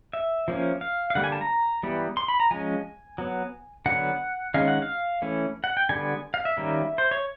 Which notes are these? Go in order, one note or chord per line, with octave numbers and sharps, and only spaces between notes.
E5
F3 A#3 C#4
F5
F5
D3 G3 A#3 F#5
G#5
A5
A#5
E3 G3 B3
C6
B5
A#5
F3 G#3 C#4 G#5
F#3 B3
D3 F#3 B3 F#5
D#3 G#3 C#4 F5
F#5
F5
E3 A3 C#4
F#5
G5
D3 G3 B3 G#5
F5
E5
D#3 G3 A#3 C#4
C5
C#5